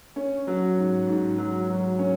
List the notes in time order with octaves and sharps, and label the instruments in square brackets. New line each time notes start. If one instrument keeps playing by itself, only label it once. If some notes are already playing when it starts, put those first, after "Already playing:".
[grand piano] C#4
F#3
G#2
G#2
F#3
F#3
C#4